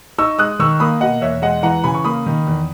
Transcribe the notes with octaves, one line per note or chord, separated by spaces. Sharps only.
D#4 C#6 E6
G#3 D#6 F#6
D#3 C#6 E6
A#3 B5 D#6
B2 D#5 F#5
E2 C#5 E5
G#3 D#5 F#5
E3 F#5 A#5
C#3 G#5 B5
C#6
A#3 B5 D#6
D#3
E2